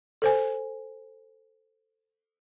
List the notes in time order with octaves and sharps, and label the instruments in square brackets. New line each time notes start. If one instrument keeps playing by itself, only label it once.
[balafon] A4 C5 G#5